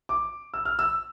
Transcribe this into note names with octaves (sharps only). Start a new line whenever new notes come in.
D6
E6
F6
E6